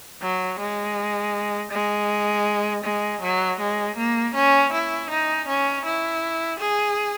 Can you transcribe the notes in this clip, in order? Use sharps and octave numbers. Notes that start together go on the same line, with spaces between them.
F#3
G#3
G#3
G#3
F#3
G#3
A#3
C#4
E4
D#4
C#4
E4
G#4